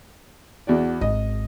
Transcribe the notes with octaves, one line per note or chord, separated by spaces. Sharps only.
E2 F#4 D5
G#1 D#5